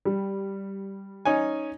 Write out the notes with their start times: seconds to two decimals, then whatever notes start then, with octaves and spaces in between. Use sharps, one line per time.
0.05 G3
1.25 C#4 D#4 G#5